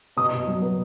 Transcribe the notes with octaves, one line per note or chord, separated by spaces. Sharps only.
B2 D#6
B2
F#3
B3